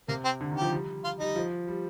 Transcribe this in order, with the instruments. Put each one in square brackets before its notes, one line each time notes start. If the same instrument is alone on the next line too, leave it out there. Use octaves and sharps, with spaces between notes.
[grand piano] C3 [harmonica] A#3
[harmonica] C4
[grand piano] D3
D#3
[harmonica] G4
[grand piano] F3
G3
[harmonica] F4
[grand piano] G3 [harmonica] D#4
[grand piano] F3
G3